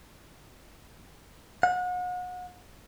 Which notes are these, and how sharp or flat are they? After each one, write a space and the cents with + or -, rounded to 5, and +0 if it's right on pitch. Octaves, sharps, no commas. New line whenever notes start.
F#5 -35